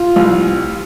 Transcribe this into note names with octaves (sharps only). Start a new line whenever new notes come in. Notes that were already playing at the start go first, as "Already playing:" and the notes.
Already playing: F4
C2